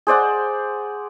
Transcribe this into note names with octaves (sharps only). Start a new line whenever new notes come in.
G#4 C5 D5 F#5